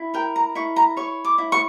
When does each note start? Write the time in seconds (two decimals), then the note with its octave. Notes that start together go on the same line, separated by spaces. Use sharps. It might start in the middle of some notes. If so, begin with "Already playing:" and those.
Already playing: E4
0.14 A#4 G5
0.36 A#5
0.55 E4 C#6
0.76 A#5
0.97 C#5 C#6
1.25 D6
1.38 E4
1.52 C#6